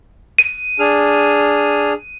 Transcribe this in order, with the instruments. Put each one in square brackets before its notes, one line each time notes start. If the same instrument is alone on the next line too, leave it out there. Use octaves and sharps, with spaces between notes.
[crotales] D#7
[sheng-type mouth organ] D4 G#4 F6